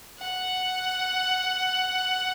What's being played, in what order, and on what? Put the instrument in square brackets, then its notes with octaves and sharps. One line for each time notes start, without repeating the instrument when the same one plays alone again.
[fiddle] F#5